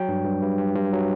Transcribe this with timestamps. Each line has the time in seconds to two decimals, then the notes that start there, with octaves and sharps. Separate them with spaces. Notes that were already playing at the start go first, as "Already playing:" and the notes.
Already playing: F#3 G5
0.09 G2
0.25 G2
0.42 G2
0.59 G2
0.76 G2
0.93 F#3